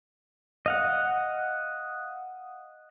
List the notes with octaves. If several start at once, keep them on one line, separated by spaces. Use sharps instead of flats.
D#5 F5 F#5